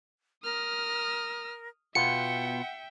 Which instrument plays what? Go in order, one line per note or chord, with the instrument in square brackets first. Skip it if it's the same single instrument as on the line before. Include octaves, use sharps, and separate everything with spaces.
[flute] A#4 [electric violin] D#6 F6
[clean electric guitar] B2 B3 F4 [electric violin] E5 G5 [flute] F#5 [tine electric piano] C#7